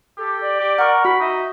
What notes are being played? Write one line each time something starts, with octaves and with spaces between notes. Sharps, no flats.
G4 A4
D5
G4
A#4 F#5 C#6
F#4 B5
D#4 E5